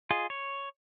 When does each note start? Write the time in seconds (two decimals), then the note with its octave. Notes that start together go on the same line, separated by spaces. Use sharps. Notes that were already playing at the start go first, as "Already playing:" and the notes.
0.11 F4 G#4 D#5
0.30 C#5